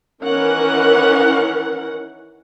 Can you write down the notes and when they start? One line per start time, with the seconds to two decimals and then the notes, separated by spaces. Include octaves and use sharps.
0.23 D#3 E3 C#4 A#4 F#5